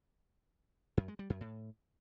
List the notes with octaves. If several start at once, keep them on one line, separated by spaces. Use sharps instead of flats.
F#2
G#3
G3
F#2
A2